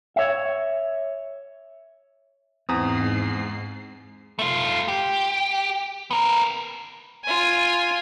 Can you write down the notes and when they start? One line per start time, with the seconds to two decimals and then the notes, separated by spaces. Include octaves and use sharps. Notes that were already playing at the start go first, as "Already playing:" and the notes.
0.16 C#5 E5
2.69 E2 G#2 C4 A#5 D#6 C7
4.39 A3 F4
4.88 G4
6.11 B3 A#4
7.24 F4 G#5